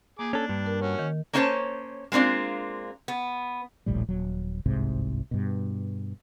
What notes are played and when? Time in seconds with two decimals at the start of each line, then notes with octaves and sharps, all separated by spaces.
0.19 A#3 G#4 D6
0.33 C#4 D4 A4
0.49 G2
0.66 A#4
0.82 C#4 F#4
0.99 D#3
1.33 A#3 C#4 D4 C5 C#5 A5
2.12 G#3 A#3 C4 D4 F4
3.08 B3
3.86 D#1 A#1 A2 G3
4.08 D#1 F#3
4.66 G1 C2 G#2 C3
5.31 G2 B2